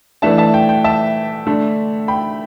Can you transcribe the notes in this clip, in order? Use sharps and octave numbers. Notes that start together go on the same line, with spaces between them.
E3 A3 D4 E5 A5
E5 A5
G5
G5
E5 A5
D3 A3 D4
G5 B5